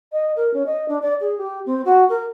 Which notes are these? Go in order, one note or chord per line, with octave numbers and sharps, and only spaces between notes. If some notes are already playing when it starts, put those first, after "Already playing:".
D#5
A#4
C#4
D#5
D4
D5
G#4
G4
C4
F#4
A#4